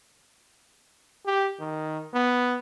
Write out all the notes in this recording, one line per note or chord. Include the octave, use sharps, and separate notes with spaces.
G4
D#3
B3